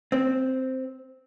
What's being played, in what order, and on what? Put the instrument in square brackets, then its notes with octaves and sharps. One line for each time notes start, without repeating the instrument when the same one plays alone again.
[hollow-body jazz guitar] C4